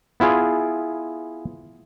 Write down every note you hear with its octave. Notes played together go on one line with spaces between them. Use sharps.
B3 E4 F4 G#4